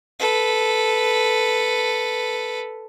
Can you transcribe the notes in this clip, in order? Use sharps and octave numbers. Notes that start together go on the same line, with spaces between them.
A4 B4